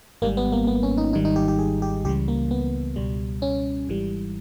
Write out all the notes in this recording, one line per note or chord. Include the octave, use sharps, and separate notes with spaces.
G#1 G#2 G3 A#3
B3
A#3
B3
C#4
D#4
G#1 G#2 D#3 G3 D#4
D#4
G4
G4
G#4
G4
C#2 C#3 E3 G3 G4
A#3
B3
C#2 B2 G3
C#4
G#1 G#2 E3 G3